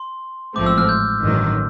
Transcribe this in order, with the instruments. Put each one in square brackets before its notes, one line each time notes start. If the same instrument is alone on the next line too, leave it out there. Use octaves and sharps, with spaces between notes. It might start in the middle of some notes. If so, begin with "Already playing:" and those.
Already playing: [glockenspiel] C6
[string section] A1 G#2 F3 A3 C4 [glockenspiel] D6
[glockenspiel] E6
F6
G6
[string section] A1 G2 D#3 F#3